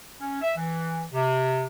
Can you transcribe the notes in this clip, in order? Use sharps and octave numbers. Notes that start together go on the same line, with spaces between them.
C#4
E5
E3
C3